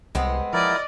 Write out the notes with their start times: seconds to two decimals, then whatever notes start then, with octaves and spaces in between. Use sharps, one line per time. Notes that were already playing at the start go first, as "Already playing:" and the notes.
0.15 C2 G#3 B3 C4
0.53 F3 E4 A#4 D5 D#5